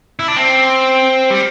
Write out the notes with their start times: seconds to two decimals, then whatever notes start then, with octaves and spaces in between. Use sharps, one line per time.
0.19 E4
0.28 D4
0.37 C4
1.30 G3